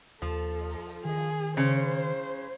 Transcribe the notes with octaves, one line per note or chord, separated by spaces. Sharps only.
D#2 F3 A4
D#3 G#4
C#3 C#4 C5